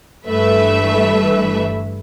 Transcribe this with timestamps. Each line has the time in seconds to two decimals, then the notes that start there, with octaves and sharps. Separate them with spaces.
0.24 G1 G2 E3 A3 B4 E5